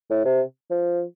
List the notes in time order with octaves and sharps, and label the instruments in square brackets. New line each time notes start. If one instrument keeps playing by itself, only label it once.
[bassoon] A2
C3
F3